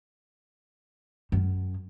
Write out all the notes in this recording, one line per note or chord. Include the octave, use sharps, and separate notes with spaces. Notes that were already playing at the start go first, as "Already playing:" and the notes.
F#2